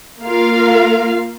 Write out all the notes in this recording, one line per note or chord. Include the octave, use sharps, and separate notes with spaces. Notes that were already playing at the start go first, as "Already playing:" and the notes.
A#3 F4 A#4 F5